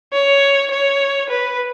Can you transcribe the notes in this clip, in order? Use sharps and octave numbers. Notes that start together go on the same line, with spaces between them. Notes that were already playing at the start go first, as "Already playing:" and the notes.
C#5
C#5
B4